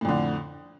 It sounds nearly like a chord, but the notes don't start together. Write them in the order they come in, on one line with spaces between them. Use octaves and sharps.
A2 F2 D3